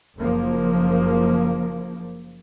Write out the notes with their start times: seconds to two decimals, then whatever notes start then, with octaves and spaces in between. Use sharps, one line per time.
0.15 F#1 F3 A#3